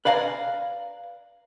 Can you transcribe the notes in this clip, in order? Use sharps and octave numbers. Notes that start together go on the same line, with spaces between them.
B4 D5 F5 G#5 A#5